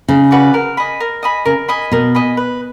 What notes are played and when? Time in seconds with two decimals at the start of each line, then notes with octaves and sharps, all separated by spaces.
0.08 C#3 D#4
0.31 F#4 B4 D5
0.54 A#4
0.77 D#5 G#5 B5
1.00 A#4
1.23 D#5 G#5 B5
1.45 C#3 A#4
1.68 D#5 G#5 B5
1.92 B2 A#4
2.15 D#5 G#5 B5
2.37 B4